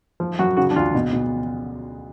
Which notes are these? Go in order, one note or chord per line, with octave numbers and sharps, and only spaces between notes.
F3
F#2 F#4
C#3 F#4
D4
D2 F4
B2
B2